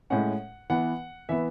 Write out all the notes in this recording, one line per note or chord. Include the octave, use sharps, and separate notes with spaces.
A2 G#3 C#4 F#5
E3 B3 F#5
E3 B3 E5